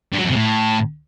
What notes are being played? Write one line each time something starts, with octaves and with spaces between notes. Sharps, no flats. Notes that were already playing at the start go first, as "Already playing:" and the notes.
G2
F#3
F2
C3
A2